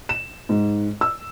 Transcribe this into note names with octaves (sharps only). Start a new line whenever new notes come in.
E7
G#2
E6